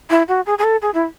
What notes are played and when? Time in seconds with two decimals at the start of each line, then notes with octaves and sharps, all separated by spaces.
0.10 E4
0.28 F#4
0.46 G#4
0.58 G#4
0.64 A4
0.82 G#4
0.94 E4